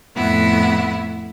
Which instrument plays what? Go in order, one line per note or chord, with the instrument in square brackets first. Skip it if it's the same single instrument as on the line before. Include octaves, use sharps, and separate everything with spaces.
[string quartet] F2 A2 B3 E4 F#5